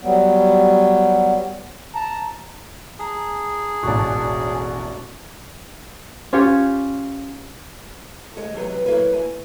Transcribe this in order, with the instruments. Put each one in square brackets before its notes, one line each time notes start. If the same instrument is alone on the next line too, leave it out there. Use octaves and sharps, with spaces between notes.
[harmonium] F#3 G3 B3
A5 A#5
[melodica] G#4 [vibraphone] A5 A#5
[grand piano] E1 A1 [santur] D4 D#4 F#4
[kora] C#4 F4 G4 C#5
[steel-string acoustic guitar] D2 G#3
E2 C3 F#3 B4
F#3 A#3 E4 B4
G#5